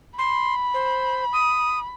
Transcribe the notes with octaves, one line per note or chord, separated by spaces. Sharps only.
B5 C6
C5
D#6